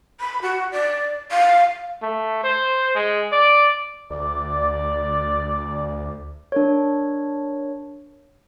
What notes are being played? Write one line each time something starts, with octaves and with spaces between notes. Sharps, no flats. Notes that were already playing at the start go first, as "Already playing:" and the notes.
B5
F#4
D5
F5
A3
C5
G#3
D5
D2 D5
D4 A#4 C#5